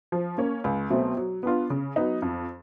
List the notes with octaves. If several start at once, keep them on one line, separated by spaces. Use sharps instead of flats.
F3
A#3 C#4
C#2
B2 F#3 A3 C4
F#3
B3 D4 F4
C#3
F#3 B3 D#4
F2